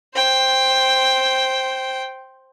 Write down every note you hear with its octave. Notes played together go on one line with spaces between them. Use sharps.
C5 G5